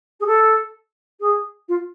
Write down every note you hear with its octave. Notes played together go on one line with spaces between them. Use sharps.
G#4
A4
G#4
F4